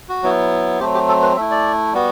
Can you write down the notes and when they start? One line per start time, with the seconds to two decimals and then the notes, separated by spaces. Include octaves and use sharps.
0.09 F#4
0.23 F#3 B3 E4
0.80 F#3 A3 C4 G4
0.94 G4
1.08 A4
1.22 B4
1.36 A3 E4 E5
1.51 D5
1.93 G3 B3 F#4